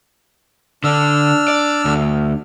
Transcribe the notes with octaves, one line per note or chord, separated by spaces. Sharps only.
D3 D4 E6 F6
D5
D2